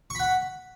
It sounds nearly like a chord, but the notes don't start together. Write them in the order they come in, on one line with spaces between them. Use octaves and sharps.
C#6 B5 F#5